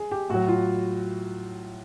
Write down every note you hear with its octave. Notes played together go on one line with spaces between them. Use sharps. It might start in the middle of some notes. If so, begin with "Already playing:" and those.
Already playing: G#4
G4
A2 F#3 F#4
F4